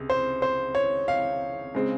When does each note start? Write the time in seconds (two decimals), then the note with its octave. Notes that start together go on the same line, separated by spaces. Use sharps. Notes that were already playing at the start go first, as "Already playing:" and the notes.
Already playing: C#2 C3
0.10 C5
0.42 C5
0.75 C#5
1.08 F5
1.75 C#3 G#3 C4